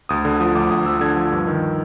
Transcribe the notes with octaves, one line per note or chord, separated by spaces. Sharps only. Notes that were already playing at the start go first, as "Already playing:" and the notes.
D2 D#6
D3
F3 D#6
D2 D6
D2 D#6
F3 E6
D3 G#6
F3
G2
D#3